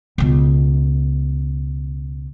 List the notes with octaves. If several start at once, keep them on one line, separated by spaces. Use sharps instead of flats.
C#2 B2